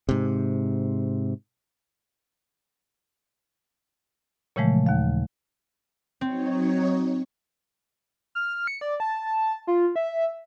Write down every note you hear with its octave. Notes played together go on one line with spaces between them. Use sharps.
G#2 C3
A#2 C#3 E3 F3 G#3 A3
D#2 F5
F#3 C4 D#4 C#5
F6
C#7
D5
A5
F4
E5